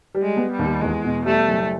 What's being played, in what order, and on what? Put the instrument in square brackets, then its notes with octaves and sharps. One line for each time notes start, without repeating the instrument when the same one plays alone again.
[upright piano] G3
[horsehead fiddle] G#3
[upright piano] B3
[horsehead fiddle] G3
[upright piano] D#2
[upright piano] E2 [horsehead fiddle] G#3
[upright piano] B2
[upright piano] G3 [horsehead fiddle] A3
[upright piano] F#1